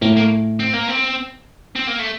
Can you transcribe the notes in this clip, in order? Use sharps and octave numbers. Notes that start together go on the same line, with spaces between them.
A2 A#3
A#3
C4
A#3
C4
C4
A#3
A3